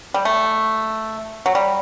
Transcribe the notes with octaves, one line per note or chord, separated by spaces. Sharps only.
G3
A3
F#3
G3